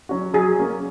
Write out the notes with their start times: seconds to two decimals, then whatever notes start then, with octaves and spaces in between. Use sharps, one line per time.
0.09 F#3 C#4 F#4
0.34 F#3 G#4
0.59 A#3 C#4